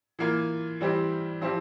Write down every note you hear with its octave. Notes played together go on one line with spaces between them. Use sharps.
E3 A#3 F4
E3 G3 C4 E4 G4
F3 C4 E4 G4